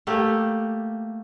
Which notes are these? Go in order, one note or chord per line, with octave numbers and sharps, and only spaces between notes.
A3 A#3 G4